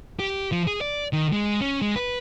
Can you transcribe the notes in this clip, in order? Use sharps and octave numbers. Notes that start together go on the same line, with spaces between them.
G4
F3
G#4
D5
D#3
G#3
C#4
G#3
B4